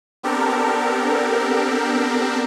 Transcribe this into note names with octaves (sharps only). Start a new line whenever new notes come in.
B3 C4 D4 G4 A4 A#4